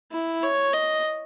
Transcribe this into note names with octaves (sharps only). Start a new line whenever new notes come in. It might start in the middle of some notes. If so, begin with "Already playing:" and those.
E4
C#5
D#5